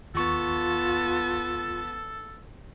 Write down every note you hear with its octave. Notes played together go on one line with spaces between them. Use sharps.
D#2 B3 F4 A4 A5 C#6